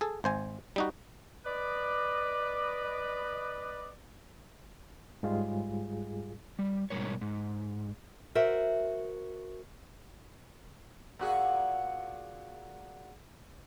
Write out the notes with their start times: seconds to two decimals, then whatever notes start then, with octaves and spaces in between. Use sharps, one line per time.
0.01 G#4 A4
0.24 G#1 C5 G#5
0.76 G3 D#4 F#4
1.45 B4 D5 D#5
5.23 G#2 G3 G#3 F4 G#4
6.59 G3
6.90 G#2 B2 E3 G3 A#4 C#5
7.21 G#2
8.35 F#4 A#4 C5 E5
11.19 A#2 F#4 G#4